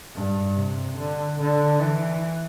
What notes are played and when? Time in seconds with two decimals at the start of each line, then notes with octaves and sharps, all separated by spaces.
0.15 G2
0.57 C3
0.98 D3
1.40 D3
1.81 E3